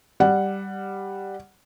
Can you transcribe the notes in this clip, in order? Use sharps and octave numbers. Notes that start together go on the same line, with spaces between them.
G3 F#5